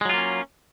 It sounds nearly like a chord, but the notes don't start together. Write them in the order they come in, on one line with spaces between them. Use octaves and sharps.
G#3 F#3 F4 A#3 C#4